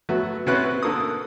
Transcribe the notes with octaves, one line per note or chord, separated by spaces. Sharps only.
F#3 A3 B3 F#4
B2 C4 C#4 E4 B4 F#6
D3 A#3 A4 A#4 D#6